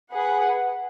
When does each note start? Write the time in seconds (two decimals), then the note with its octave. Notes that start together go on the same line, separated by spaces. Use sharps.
0.11 G#4 B4 F#5